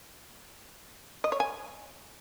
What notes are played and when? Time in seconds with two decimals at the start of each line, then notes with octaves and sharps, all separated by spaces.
1.24 D#5
1.32 C#5
1.40 G#5